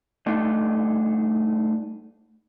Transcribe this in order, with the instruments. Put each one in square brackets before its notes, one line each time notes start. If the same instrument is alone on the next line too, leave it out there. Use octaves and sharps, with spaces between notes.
[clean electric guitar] G2 A3 D4 D#4